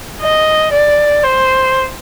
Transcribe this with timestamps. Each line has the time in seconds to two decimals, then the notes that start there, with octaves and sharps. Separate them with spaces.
0.22 D#5
0.72 D5
1.23 C5